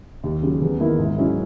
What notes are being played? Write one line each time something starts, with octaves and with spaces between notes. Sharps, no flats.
D#2
C#3 F#3
E2
D#3 A#3 E4
G#2
F#3 C#4 E4